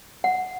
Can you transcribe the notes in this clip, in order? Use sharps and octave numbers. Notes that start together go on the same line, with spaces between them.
F#5